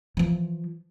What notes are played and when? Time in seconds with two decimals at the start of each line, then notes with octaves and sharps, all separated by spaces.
0.17 E3 F3